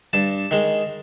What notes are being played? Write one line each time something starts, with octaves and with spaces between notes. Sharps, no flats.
G2 A5
D#3 G#3